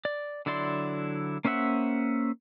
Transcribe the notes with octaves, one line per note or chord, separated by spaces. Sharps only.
D5
D3 F#3 E4 D5 C6
A#3 C#4 C5 E5 F#5